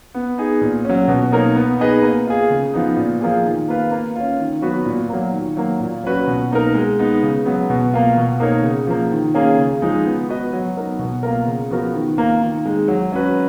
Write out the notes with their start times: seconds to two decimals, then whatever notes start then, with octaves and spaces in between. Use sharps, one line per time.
0.14 B3
0.38 D#4 G#4
0.61 A#2
0.85 F#3 C#4
1.08 B2
1.32 A#3 D#4 A#4 C#5
1.56 B3
1.79 D#4 G#4 B4 D#5
2.02 A#3
2.27 F4 G#4
2.50 C#3
2.74 F3 B3 D#4
2.97 A#2
3.21 F3 A#3 F4 G#4
3.45 D#3
3.68 A#3 F4 B4
3.91 A#3
4.16 C#4 F4
4.40 D#3
4.62 F#3 B3 F#4 B4
4.86 A#2
5.09 F#3 A#3
5.33 D#3
5.57 F#3 A#3
5.80 A#2
6.04 F#3 C#4 F#4 B4
6.27 B2
6.52 A#3 D#4 A#4
6.74 G#3
6.99 B3 D#4
7.23 C#3
7.45 F#3 B3
7.70 B2
7.94 A#3 F4
8.17 B2
8.40 A#3 D#4 A#4 C#5
8.63 C#3
8.87 F3 A#3
9.12 D#3
9.34 A#3 C#4 F4 G#4
9.58 C#3
9.82 F3 G#3 D#4 G#4
10.05 B3
10.29 F#4 B4 D#5
10.53 F#3
10.77 B3 D#4 A#4
10.99 B2
11.23 A#3 F4 A#4
11.47 C#3
11.70 F3 B3 F#4 A#4
11.94 D#3
12.18 A#3 F4
12.41 D#3
12.66 G#3 D#4
12.88 F#3
13.12 C#4 F#4 B4